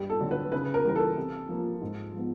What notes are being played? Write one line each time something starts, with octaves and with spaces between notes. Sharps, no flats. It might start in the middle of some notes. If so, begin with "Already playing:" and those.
Already playing: G2 G4
A4
D3 F#3
B4
C#3 B4
A#4
E3 G3 A#4
A4
C3
F3 A#3
G#2
F3 G#3 B3